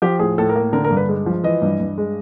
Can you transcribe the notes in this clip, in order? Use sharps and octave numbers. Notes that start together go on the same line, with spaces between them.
F3 G4
A2 G#4
A2 A4
A#4
A#3
D3 A#4
A#4
G2
B4
G#3
F3
E3 D#5
G2
G2
G#3